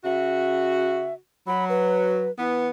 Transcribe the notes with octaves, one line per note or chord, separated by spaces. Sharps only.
C#3 F#4 E5
F#3 B5
B4
E3 B3